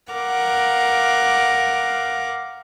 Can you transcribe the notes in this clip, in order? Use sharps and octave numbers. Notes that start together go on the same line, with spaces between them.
A#4 F5 F#5 D6